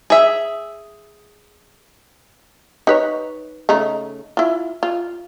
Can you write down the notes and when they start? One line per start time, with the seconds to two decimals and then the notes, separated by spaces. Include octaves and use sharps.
0.10 G#4 E5
2.87 D#4 B4 C#5
3.69 C#3 A3 D#4
4.37 E4 F4
4.83 F4